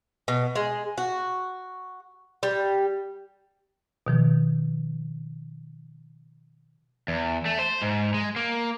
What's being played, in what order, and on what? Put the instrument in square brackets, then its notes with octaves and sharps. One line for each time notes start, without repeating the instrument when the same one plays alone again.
[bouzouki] B2
G#3
F#4
G3
[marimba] B2 D#3 F3
[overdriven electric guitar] E2
A3
C5
G#2
G#3
A#3